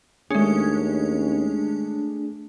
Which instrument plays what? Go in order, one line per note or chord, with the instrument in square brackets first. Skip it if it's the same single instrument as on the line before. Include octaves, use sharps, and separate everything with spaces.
[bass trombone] D#2 [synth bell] G#3 C#4 [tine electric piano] A3 G#4 [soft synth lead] D4